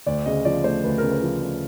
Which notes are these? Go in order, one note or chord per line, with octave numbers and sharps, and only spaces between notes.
D2 D5
C#3 D#5
F3 D5
A3 C5
D2 B4
A#4
C#3
B4
F3
A3